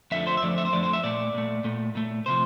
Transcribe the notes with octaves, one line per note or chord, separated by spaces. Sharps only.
F2 D3 F3 A3 E5
C5
E5
F2 D3 F3 A3 D5
E5
C5
F2 D3 F3 A3 D5
C5
E5
A#2 A3 D5
A#2 A3
A#2 A3
A#2 A3
C3 F3 C5